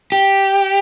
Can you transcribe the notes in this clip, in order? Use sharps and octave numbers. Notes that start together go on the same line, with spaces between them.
G4